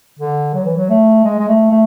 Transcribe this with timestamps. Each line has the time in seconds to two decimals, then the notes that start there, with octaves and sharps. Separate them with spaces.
0.19 D3
0.54 F#3
0.65 E3
0.77 F#3
0.89 A3
1.25 G#3
1.39 G#3
1.48 A3
1.71 A3